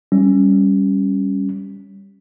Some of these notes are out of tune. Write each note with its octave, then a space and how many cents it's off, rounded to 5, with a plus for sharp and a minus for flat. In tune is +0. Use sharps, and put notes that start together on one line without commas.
G3 +0 C#4 +0